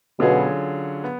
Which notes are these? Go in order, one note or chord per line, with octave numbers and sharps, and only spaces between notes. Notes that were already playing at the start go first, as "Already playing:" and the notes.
B2 D3 F#3 C#4 F4 G#4
B3